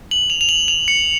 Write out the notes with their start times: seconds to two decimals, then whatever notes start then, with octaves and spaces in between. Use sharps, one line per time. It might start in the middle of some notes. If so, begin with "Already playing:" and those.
0.11 F#7
0.30 F7
0.41 F7
0.49 F#7
0.68 F7
0.88 C#7